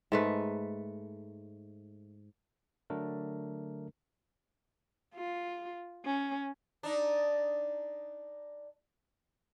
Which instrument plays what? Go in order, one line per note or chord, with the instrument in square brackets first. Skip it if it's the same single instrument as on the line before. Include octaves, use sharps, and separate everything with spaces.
[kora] G#2 A3 B4
[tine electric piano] D3 F#3 A3 D4 A#4
[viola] F4
C#4
[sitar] D4 D#4